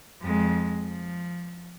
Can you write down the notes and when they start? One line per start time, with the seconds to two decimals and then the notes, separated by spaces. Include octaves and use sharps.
0.21 F2 G#3
0.80 F3